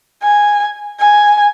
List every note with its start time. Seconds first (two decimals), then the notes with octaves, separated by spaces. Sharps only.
0.22 G#5
1.00 G#5